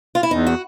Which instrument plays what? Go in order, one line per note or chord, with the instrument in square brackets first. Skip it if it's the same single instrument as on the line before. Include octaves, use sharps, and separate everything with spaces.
[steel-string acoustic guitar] F4
E4
[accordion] E2 [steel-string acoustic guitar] D#4
[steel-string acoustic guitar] F#4